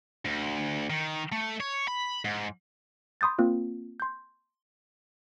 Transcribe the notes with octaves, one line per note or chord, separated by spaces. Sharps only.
D2
D#3
A3
C#5
B5
G#2
B5 C6 D#6 G6 A6
A#3 C4 F4
C6 G6